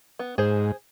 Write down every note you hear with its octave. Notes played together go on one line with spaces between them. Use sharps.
B3
G#2 G#4 C5